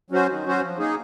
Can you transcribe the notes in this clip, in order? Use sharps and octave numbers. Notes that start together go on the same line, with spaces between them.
F#3 C#4 F#4 C5
D#3
F#3 C#4 F#4 C5
F3
A#3 D#4 G#4